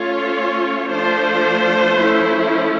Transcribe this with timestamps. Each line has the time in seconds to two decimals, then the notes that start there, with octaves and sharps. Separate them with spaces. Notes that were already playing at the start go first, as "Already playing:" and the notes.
Already playing: A3 C#4 F4 C#5
0.89 F3 A3 D4 F4 C5
1.98 F3 A3 C#4 E4